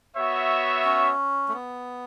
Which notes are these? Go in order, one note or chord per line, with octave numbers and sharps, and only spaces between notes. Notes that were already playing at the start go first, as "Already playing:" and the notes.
B3 F#4 C#5 E5
C#4
A3
B3